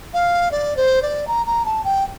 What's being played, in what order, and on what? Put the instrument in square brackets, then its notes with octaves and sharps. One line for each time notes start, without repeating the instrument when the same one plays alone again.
[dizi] F5
D5
C5
D5
A#5
A#5
A5
G5